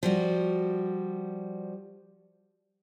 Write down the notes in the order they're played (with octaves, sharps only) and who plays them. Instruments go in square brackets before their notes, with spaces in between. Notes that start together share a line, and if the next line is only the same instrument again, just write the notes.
[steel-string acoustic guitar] F3 G3 F#4